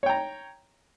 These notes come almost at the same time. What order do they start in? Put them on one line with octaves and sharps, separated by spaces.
C#5 G5 A#5